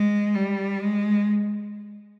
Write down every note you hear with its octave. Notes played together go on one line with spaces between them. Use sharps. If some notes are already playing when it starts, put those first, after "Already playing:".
Already playing: G#3
G3
G#3